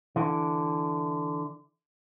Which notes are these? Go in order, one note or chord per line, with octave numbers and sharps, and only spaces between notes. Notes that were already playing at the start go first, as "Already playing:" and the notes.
D3 E3